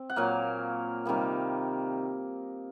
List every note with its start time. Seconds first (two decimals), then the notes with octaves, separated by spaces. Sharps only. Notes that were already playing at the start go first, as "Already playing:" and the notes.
Already playing: C4
0.10 F#5
0.16 A#2 F#3 A#3 F5
1.06 C3 D#3 G3 A#3